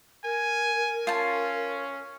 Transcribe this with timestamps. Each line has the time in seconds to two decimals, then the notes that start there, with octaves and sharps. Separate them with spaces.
0.24 A#4 G#5
1.07 C#4 F4 A5